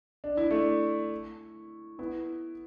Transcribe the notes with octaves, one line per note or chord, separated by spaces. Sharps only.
D4
E4
A3 D4
B3 E4